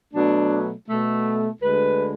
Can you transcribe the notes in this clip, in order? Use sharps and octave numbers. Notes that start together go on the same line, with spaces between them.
B2 F#3 A3 D4
B2 A3
D2 D3 G#3 B4